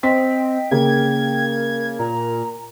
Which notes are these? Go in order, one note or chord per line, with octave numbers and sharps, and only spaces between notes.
C4 D#5 G5 B6
C#3 A#3 A#4 G#6
A#2 A#5